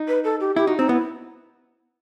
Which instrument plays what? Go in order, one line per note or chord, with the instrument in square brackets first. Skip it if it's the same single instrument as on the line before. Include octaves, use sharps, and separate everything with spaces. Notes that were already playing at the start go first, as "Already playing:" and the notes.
Already playing: [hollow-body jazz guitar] D#4
[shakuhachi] B4
A4
G4
[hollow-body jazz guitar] E4 [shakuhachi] G4
[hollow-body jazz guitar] D#4 [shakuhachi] F#4
[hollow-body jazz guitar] C4 [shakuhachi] D#4
[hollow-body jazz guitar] B3 [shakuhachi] E4